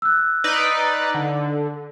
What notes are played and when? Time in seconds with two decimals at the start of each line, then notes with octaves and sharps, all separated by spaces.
0.02 E6 F#6
0.44 D#4 B4 D5
1.14 D3